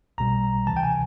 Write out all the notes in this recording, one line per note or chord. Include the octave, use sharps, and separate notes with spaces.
B1 B2 G3 A#5
D2 C3 E3 A5
G5
G#5